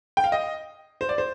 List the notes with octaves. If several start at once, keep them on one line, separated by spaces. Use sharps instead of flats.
G5
F5
D#5
C5
D5
C5